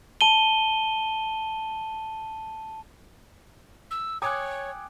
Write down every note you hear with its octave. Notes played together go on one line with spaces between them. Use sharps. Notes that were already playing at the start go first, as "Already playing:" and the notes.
A5 D#7 G7
E6
C#5 G5 G#5 D6 D#6 F#6 G#6